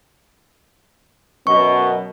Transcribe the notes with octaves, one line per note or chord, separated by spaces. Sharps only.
F#2 B2 C#6